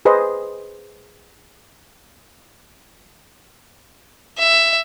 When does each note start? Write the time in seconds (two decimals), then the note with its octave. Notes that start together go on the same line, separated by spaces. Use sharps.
0.05 G#4 B4 C5 D#5
4.39 E5